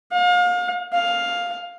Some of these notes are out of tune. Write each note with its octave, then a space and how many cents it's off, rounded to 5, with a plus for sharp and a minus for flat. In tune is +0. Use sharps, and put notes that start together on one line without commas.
F5 +35
F5 +10